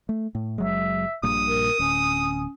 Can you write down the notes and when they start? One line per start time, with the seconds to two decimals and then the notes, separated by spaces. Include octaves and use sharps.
0.09 A3
0.35 A2
0.58 F#1 F#3 G#3 E5
1.23 A#1 G2 A#2 D#6
1.47 A#4
1.79 D1 C#4